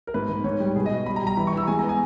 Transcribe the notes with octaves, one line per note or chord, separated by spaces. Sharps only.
A#4
G#2 B4
G#2
G#2 C#5
G3
B2 G#4
D#5
B2
G3 B5
A#5
G3
A#5
E3 B5
C#6
E3 E6
G#3 G#5
A#5
B3
G#5